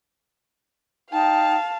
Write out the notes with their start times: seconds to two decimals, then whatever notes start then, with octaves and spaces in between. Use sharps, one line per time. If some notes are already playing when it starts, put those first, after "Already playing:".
1.12 D#4 F5 G5 A5